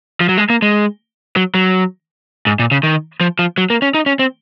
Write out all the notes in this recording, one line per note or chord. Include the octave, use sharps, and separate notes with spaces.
F3
F#3
G#3
A#3
G#3
F#3
F#3
G#2
A#2
C#3
D#3
F3
F3
F#3
A#3
C#4
D#4
C#4
C4